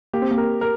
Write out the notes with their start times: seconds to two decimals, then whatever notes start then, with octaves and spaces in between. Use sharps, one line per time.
0.13 A#3 G4
0.22 C4
0.31 A#3
0.38 A#4
0.61 A#4